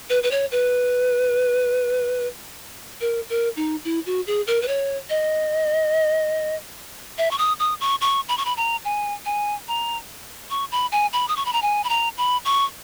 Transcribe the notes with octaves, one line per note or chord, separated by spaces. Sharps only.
B4
B4
C#5
B4
A#4
A#4
D#4
E4
F#4
G#4
A#4
B4
C#5
D#5
E5
C#6
D#6
D#6
C#6
C#6
B5
C#6
B5
A#5
G#5
G#5
A#5
C#6
B5
G#5
B5
D#6
C#6
B5
A#5
G#5
B5
A#5
B5
C#6